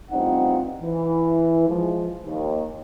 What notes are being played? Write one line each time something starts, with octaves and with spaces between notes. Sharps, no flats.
A1 G2 C4 D#4 F4 F#5
E3
F3 G#3
D#2